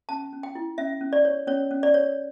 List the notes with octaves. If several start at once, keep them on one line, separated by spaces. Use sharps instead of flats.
C#4 A5
C#4
G5
E4
C#4 E5
C#4
D5
C#5
C#4 C#5
C#4
D5
C#5